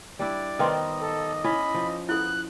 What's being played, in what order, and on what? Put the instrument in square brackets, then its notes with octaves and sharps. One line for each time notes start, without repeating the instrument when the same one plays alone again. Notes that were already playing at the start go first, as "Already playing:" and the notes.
[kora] G3 D4 E4 [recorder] D5
[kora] D#3 B3 C5 [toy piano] B4 G5 C6 [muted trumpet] D#5
[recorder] A4
[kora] C#4 [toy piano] E4 [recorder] B5
[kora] F3
[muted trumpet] B3 [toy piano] E4 A4 [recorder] F#6